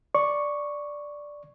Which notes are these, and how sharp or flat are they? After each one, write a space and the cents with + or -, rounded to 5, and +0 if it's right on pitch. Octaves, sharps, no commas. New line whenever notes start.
D5 +0 C#6 +0